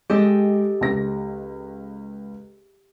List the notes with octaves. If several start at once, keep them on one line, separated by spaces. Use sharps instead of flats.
G#3 G4 A4 D#5
C#2 A#6